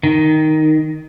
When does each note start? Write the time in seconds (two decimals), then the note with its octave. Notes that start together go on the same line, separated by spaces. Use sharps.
0.03 D#3